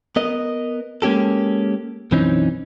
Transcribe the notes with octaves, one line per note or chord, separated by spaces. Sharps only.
B3 A#4 D#5
G#3 A#3 C#4 G4 A4
B1 F#2 E3 C4 C#4 D#4